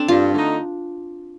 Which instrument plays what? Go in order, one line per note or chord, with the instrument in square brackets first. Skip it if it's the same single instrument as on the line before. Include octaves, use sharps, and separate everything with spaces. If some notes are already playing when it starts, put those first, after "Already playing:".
Already playing: [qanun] C4 D4 A4
[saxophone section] G2 [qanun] F4
[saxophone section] D3 A3 D#4